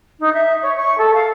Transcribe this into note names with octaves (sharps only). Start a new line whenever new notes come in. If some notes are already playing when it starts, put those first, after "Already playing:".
D#4
E5
C#5
C#6
A4
F5